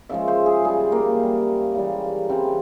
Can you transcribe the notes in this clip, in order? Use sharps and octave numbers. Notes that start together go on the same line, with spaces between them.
C#3 F3 G#3 E5
C5
G#4
C#3 G3 G#4
A#3
C#3 G3
C#3 E3 G3
C#3 E3 G3 C4